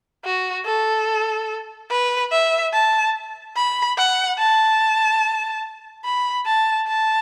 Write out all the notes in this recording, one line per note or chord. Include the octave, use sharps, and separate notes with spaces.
F#4
A4
B4
E5
A5
B5
F#5
A5
B5
A5
A5